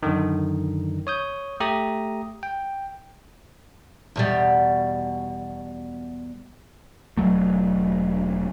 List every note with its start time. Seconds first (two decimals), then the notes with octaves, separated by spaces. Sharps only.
0.03 F#2 D3 D#3
1.07 C#5 D#6 G6
1.60 A3 G4 A#5 D#6
2.43 G5
4.16 E2 B2 G3
7.17 E1 F#3 A3